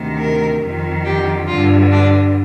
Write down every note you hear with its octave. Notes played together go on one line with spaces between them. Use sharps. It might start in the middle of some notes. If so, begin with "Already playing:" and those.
Already playing: D2 C3 D#3
A#4
F2 D#3
G4
G2 D3 F4
D4